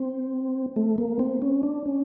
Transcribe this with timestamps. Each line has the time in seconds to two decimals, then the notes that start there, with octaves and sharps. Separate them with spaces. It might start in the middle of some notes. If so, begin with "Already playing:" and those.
Already playing: C4
0.76 A3
0.98 A#3
1.19 C4
1.42 C#4
1.63 D4
1.86 C#4